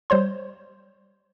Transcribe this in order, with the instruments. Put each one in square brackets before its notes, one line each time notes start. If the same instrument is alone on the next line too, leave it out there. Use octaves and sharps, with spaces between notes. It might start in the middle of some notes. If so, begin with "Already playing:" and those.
[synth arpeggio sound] G3 C5 C#5 C6